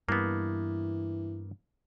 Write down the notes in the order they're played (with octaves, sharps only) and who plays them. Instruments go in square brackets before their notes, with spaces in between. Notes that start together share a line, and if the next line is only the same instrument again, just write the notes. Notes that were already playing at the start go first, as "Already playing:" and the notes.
[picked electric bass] G2 [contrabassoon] E3 [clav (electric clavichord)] A#3 B3